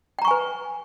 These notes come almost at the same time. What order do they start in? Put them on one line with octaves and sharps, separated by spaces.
G5 A#5 C#6 G#5 B4